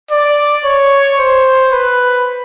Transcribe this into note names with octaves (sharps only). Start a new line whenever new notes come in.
D5
C#5
C5
B4